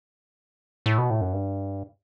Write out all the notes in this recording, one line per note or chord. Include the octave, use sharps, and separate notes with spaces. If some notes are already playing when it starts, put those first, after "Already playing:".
A2
B2
A2
F#2
G2